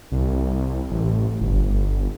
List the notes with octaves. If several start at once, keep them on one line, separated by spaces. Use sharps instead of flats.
C2
A1
G1